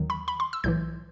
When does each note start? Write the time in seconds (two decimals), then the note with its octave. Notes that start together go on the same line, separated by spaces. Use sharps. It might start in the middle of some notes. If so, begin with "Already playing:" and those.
Already playing: D#2 D#3 F#3
0.10 B5
0.28 B5
0.40 C6
0.53 E6
0.64 B1 A2 E3 G6